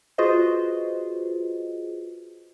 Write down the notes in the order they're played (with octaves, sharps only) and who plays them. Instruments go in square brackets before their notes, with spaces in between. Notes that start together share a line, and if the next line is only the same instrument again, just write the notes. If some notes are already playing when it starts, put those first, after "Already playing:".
[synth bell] F4 F#4 G#4 B4 C5 D#5